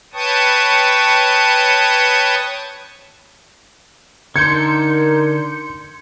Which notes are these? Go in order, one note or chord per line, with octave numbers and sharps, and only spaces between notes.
B4 C#5 G5 A5 C#6 D#6
D3 D#4 A#4 C6 G6 G#6 C#7